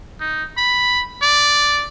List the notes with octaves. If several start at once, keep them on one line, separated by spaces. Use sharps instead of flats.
D#4
B5
D5